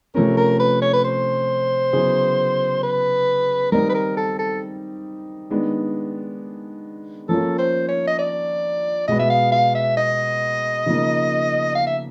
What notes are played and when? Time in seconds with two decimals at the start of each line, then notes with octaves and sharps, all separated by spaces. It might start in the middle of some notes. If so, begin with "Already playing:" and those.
0.14 C3 F3 A3 C#4 A#4
0.37 A#4
0.59 B4
0.82 C#5
0.93 B4
1.04 C5
1.93 C#3 F#3 B3 E4 G#4
2.83 B4
3.72 D#3 G3 C4 D#4 A#4
3.89 B4
3.94 A#4
4.17 A4
4.39 A4
5.50 D#3 G#3 B3 D4
7.29 F3 A#3 C#4 F4 A4
7.58 C5
7.89 C#5
8.07 D#5
8.19 D5
9.08 B2 G#3 B3 D#5
9.19 E5
9.30 F5
9.52 F5
9.75 E5
9.97 D#5
10.86 C#3 F3 A#3 D#4
11.75 F5
11.87 E5